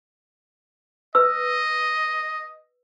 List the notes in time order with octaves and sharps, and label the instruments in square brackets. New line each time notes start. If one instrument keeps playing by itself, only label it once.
[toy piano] B4 E6 [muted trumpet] D#5